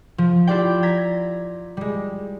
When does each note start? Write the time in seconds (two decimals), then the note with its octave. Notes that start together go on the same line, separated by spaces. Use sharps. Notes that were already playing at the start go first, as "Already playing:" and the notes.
0.18 F3
0.47 E4 F4 G4 D5 G5
0.83 A#5 G#6 B6
1.77 G3 G#3